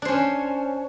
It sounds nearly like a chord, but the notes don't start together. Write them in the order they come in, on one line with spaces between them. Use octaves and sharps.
D4 C5 C#4